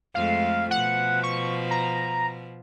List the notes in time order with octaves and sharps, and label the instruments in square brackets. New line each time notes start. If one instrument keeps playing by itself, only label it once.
[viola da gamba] F2 G#3 A3 [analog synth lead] F5
[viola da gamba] B2 F3 [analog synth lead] F#5
[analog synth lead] C#6
A#5